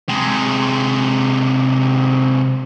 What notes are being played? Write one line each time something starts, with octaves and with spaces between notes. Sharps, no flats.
C3 G#3